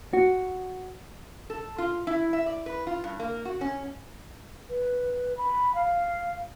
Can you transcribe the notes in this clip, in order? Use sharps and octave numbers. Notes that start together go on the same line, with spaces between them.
F#4
A4
F4
E4
E5
D5
B4
F4
G2
A#3
F#4
C#4
B4
B5
F5